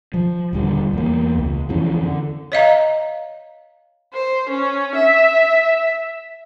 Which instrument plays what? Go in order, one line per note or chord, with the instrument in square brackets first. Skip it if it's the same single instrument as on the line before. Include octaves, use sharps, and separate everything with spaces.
[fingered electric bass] F3
D#1 D3 G3
E2 A#3
C#2
F2 E3 C#4
D3
[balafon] C#5 D#5 F5 A#5
[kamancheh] C5
C#4
E5